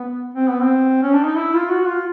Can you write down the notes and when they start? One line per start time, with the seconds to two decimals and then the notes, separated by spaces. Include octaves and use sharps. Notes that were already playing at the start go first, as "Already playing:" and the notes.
Already playing: B3
0.35 C4
0.48 B3
0.62 C4
1.03 C#4
1.14 D4
1.26 D#4
1.37 E4
1.54 F4
1.71 F#4
1.88 F4